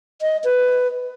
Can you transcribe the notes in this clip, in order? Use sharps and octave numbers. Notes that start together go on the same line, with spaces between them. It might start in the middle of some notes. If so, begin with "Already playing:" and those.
D#5
B4